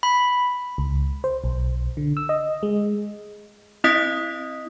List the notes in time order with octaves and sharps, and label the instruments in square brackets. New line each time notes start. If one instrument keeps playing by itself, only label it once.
[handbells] B5
[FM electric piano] C#2
C5
B1
D3
E6
D#5
G#3
[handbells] C4 E4 D#5 D#6 B6